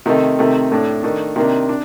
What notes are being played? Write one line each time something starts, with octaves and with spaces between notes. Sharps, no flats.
C3 D#3 A3 D#4
C3 D#3 A3
A2 A3 D4
D#3 A3 D4
C3 D#3 A#3 D4
D4